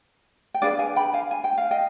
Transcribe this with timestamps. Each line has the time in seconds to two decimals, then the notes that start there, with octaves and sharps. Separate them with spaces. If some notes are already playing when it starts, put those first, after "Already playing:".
0.54 G5
0.62 D4 G#4 B4 D5 F5
0.79 F5 G#5
0.96 G5 B5
1.13 F5 G#5
1.31 G#5
1.44 G5
1.58 F5
1.71 D#5 G5